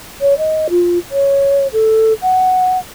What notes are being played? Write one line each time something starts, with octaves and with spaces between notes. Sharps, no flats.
C#5
D#5
F4
C#5
A4
F#5